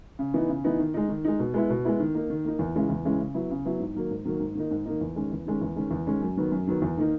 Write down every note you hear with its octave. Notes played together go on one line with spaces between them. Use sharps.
C#3
E3 B3 D#4
C#3
E3 B3 D#4
D#3
G#3 D#4
D#3
G#3 D#4
B2
G#3 B3 E4
B2
G#3 B3 E4
D#3
A#3 D#4
D#3
A#3 D#4
E2
C#3 E3 G#3 C#4
E2
C#3 E3 G#3 C#4
C#3
F#3 B3 E4
C#3
F#3 B3 E4
G#2
D#3 F#3 A#3
G#2
D#3 F#3 A#3
G#2
D#3 A#3 D#4
G#2
D#3 A#3 D#4
E2
D#3 G#3 C#4
E2
D#3 G#3 C#4
E2
D#3 G#3 C#4
E2
D#3 G#3 C#4
F#2
D#3 F#3 B3
F#2
D#3 F#3 B3
E2
D#3 A#3 D#4